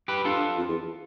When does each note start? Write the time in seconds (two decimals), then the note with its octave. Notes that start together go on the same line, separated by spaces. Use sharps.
0.08 G4 B4
0.25 G2 F4 A4
0.58 F2
0.68 E2